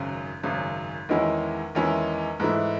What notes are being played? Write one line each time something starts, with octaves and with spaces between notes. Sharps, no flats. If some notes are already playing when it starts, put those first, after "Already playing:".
Already playing: G#1 F#2 C#3
G#1 F#2 C#3
E2 D#3 G#3 C#4 E4
E2 D#3 G#3 C#4 E4
G#2 E3 A3 E4